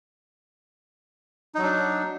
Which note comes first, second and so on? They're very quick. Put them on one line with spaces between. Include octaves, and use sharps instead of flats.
D#4 F#3 D4